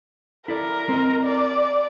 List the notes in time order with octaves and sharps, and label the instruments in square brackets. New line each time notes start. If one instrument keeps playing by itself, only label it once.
[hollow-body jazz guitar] E4 A4 D5 [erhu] A#4
[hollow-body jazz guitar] C4 D#5
[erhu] D5